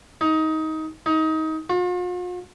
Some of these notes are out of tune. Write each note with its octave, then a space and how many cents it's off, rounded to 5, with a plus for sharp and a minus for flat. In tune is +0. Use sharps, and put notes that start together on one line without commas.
D#4 +20
D#4 +25
F4 +45